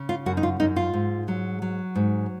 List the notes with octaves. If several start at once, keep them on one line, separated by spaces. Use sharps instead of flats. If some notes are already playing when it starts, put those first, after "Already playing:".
Already playing: C#3
F4
F#2 F#4
D#4
F4
F#2 D#4
F4
G#2
F#3
F#3
G#2